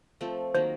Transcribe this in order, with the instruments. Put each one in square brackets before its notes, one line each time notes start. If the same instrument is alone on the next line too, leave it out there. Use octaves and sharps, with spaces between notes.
[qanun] F3 A3 C4
[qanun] D#3 F#3 A#3 [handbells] C5